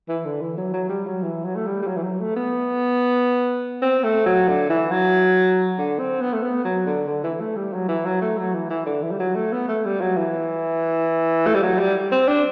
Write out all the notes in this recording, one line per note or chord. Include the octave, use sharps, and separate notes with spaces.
E3
D3
E3
F#3
F#3
G3
F#3
E3
F#3
A3
G3
G3
F#3
E3
F#3
A3
B3
C4
A3
F#3
D3
E3
F#3
D3
C4
B3
A3
B3
F#3
D3
D3
E3
A3
G3
F#3
E3
F#3
A3
F#3
E3
E3
D3
E3
G3
F#3
A3
B3
A3
G3
F#3
E3
A3
G3
F#3
G3
C4
D4